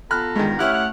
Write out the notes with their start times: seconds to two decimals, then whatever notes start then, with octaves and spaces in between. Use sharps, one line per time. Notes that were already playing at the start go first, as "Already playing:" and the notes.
0.11 B3 F4 A4 A#5 B5 F6 F#6
0.36 G2 D#3 G#3
0.59 A3 C#4 E4 G4 F#5 F6
0.74 F#5